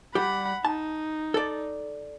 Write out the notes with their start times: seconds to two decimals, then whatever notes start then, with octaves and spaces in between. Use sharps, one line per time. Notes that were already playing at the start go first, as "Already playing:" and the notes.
0.15 G3 G4 F#5 B5
0.65 D#4 A5
1.34 A4 D5